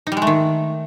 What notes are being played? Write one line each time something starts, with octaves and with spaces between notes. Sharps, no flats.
D#4
G3
G#3
A3
D#3